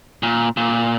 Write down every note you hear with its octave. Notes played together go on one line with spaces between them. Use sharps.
A#2
A#2